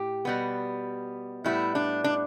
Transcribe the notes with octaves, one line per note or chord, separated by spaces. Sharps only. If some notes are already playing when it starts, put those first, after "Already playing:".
Already playing: A2 G4
B2 G3 B3
A2 G3 B3 E4
D4
D4